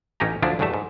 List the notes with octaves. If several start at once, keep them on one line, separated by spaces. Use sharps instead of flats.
A1 C#4 D#4 G4 A#5
D2 F3 F#3 D4 E4
G1 E2 G2 B2 A3 E5
G#2